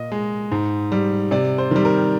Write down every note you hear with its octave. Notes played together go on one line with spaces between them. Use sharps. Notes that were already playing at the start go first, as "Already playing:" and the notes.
Already playing: A#2 D#5
G#3
G#2
G3
C3 D5
C5
D#3 G3
A#4